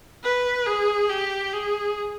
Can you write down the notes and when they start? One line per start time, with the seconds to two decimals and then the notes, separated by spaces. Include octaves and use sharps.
0.23 B4
0.66 G#4
1.09 G4
1.52 G#4